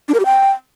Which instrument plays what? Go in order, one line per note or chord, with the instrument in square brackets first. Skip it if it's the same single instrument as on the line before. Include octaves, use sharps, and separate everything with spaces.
[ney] D4
A#4
G4
G5